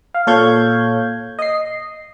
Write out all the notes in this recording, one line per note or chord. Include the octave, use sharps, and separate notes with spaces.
F5
A#2 A4 C#5 F5 G6 G#6
D#5 C7